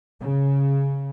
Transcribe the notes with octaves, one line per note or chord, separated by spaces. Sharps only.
C#3